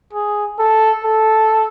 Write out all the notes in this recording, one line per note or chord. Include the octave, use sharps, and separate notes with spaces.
G#4
A4
A4